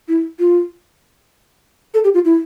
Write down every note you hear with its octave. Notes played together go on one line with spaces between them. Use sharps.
E4
F4
A4
G4
F4
E4